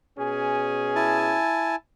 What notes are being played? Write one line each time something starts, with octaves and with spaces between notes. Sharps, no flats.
B2 C#4 G#4
E4 G#5 A5